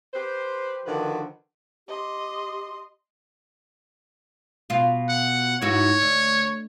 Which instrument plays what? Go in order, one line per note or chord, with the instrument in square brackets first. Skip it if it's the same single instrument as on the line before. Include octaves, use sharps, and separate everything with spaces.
[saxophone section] G4 B4 C5
D3 D#3 F3 F#4 B4
[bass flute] G4 [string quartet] D#5 C6
[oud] B2 F4
[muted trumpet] F#5
[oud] G#2 E3 F#4 [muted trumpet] C#5
[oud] D2